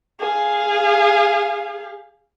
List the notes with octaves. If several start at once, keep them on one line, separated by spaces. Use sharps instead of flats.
G#4 F5